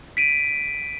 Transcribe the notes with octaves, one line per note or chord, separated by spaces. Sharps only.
B6 D7 D#7